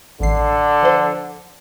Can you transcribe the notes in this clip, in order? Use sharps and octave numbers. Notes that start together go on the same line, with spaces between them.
A1 D3 C7
F3 C5